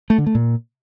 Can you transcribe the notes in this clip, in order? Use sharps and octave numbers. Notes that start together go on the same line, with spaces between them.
A3
D3
A3
A#2